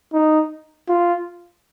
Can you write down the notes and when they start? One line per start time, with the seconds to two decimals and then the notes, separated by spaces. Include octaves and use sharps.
0.13 D#4
0.89 F4